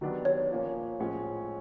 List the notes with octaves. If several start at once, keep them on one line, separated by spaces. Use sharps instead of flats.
D#3 F#3 B3 D4 G4
C#5
A#2 F3 A#3 C#4
A2 F3 G#3 C#4